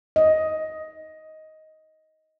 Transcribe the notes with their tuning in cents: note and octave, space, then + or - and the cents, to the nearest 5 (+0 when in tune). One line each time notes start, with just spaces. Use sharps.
D#5 +10